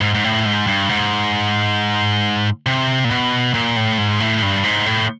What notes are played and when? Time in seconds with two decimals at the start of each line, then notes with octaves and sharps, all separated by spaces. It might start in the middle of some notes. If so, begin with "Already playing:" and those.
0.01 G#2
0.15 G#2
0.24 A2
0.46 G#2
0.67 G2
0.89 G#2
2.66 C3
3.04 A#2
3.11 B2
3.54 A#2
3.76 A2
3.98 G#2
4.20 A2
4.42 G2
4.64 G#2
4.86 A2